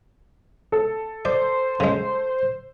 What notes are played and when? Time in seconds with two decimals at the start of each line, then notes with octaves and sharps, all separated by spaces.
0.72 A4
1.25 C5 D5
1.80 C#3 G#3